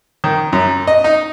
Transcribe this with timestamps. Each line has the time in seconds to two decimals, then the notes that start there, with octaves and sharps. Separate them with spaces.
0.24 D#3
0.53 F#2
0.87 D#5
1.04 D#4